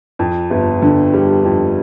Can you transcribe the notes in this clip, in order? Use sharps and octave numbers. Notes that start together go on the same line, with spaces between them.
F2
G1
D3
G3
F2